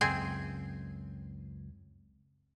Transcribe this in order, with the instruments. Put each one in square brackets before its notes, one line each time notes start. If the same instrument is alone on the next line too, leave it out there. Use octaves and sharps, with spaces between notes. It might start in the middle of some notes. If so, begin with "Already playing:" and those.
[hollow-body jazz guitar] C#2 F#2 [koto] C4 G#4 G#5